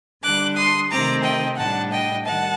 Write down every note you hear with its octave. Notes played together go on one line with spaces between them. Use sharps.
D3 G3 D4 D6 F#6
C6 D#6
C3 D#3 A3 C4 A#5 D6
D#5 G5
A2 G3 D4 F#5 A5
D#5 G5
D#3 G3 F#5 A5